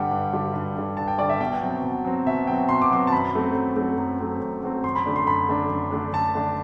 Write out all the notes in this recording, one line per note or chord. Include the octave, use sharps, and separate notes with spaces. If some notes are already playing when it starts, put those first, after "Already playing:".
Already playing: G2 D3 G3 F#5 G5
G2
D3 G3
G2
D3 G3
G2 A5
G5
D3 G3 D5
E5
B2 G5
F#3 C4
B2
F#3 C4
B2 E5
F#3 C4 G5
B2 C6
D6
F#3 C4 C6
A5
F#2 B5
F#3 A3 C4
F#2
F#3 A3 C4
F#2
F#3 A3 C4
F#2
F#3 A3 C4
F#2 C6
B5
D3 A3 D4
C6
F#2 B5
D3 A3 D4
F#2
D3 A3 D4
F#2 A5
D3 A3 D4